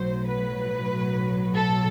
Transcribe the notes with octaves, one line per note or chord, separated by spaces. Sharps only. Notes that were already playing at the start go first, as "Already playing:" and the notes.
Already playing: B1 A2 F#3 C5
B4
A4